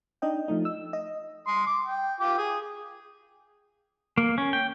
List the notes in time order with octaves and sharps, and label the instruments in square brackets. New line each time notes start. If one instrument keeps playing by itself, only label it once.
[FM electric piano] D4 D#4 D#5 G5
F3 A3 D#4
E6
D#5
[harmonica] C6 D#6
D6
G5
F4 G5 D6
G#4 D#6
[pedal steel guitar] A#3
C#4
G5